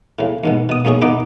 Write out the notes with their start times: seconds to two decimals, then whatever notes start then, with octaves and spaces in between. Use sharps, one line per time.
0.19 A2 C#3
0.44 D#2 G#2 B2
0.69 B2 D#6
0.85 B1 F#2 C#4 G#4 C#6
1.02 D#2 B2 B3 D#4 D6